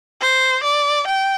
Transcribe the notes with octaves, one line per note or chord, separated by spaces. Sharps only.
C5
D5
G5